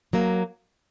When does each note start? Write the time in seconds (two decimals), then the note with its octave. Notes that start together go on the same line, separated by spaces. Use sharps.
0.13 F#3 A#3